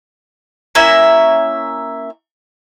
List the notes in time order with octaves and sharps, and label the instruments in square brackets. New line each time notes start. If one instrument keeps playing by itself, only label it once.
[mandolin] A#3 C#4 E4 E5